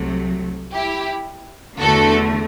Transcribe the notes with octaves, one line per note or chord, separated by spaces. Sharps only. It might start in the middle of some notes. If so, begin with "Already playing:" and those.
Already playing: C2 C3 F#3 A3
E4 G4
E2 D3 A3 F#4 A4